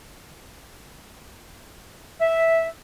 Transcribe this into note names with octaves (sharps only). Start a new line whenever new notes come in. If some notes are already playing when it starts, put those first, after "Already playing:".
E5